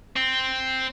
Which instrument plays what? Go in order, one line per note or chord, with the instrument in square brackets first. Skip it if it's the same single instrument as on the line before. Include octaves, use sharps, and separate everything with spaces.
[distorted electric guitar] C4